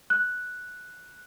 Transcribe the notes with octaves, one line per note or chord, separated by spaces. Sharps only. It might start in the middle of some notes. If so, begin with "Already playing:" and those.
F#6